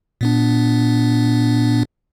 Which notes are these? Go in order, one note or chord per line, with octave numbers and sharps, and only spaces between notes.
A#2 B3 D4